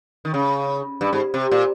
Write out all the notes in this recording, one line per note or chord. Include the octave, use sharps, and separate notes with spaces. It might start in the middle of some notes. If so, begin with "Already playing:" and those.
D#3
C#3
G2
G#2
C3
A#2